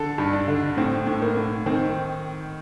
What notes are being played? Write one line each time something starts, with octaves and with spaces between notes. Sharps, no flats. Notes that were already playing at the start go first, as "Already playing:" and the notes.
Already playing: D3 A4
G2
D4
D3
A2 C4
A2
A#3
A2
D#3 C4